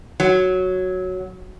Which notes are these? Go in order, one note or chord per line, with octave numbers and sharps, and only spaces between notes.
F#3